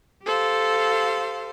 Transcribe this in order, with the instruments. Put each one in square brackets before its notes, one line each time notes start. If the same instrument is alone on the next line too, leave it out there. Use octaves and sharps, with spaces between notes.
[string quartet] G4 A4 C5 F5